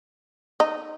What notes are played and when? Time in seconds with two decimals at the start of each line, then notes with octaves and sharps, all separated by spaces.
0.60 D#4